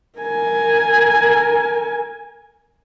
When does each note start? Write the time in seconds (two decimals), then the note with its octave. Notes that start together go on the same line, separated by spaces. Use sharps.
0.19 A#4 G#5